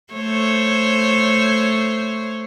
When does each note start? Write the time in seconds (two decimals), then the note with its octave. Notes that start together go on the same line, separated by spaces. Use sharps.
0.13 A3 C5 C#5